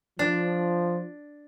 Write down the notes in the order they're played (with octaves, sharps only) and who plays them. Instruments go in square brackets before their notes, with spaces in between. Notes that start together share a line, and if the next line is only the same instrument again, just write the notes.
[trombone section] F3 [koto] D4